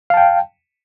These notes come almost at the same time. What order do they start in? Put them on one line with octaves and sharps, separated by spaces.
F5 A5 G5